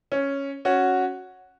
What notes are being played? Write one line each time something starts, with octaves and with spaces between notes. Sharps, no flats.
C#4
C#4 F#4